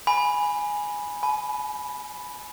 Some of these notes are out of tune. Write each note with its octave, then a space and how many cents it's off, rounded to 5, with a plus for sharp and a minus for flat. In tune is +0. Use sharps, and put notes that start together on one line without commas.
G#5 +0 B5 -5
G#5 +40 B5 +0